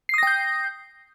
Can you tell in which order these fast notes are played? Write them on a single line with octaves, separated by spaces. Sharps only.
C7 D#6 A#6 G5 G6